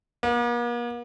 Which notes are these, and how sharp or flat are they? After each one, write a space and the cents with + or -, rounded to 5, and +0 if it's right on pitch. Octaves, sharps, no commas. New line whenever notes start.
A#3 +45